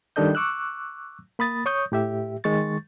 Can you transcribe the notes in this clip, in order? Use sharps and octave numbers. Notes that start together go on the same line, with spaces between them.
D#3 G3 D4 A4 D#5 G6
C#6 D6 E6 F#6
A#3 B5 D#6 A6
C#5 C#6 D#6 G6
A2 G4 E5
D#3 G#3 C#6 A6